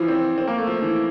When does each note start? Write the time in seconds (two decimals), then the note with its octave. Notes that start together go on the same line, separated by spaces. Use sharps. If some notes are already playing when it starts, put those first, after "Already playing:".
Already playing: E3 F3
0.08 C4
0.38 C4
0.47 A#3
0.58 A3
0.67 F3
0.82 E3